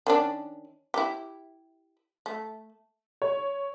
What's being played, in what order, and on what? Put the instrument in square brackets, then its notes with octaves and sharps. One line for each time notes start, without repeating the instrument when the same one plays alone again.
[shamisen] D#3 C#4 D4
E4 G4
A3
[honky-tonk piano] C#5